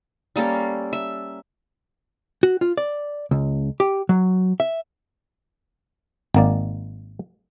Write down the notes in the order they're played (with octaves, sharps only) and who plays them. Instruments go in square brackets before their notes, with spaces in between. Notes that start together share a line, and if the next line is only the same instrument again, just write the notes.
[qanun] G3 A#3 C#4 A4
E5
[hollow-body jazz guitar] F#4
F4
D5
C#2
G4
F#3
E5
[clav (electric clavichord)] G#1 A#3 D5